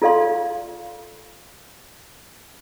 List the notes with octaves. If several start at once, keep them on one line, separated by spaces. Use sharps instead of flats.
F4 A4 D5 F5 C6